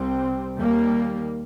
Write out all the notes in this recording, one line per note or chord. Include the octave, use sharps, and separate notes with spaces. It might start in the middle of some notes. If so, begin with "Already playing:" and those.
Already playing: C2 C3 G3 C4
D#2 D#3 G3 A#3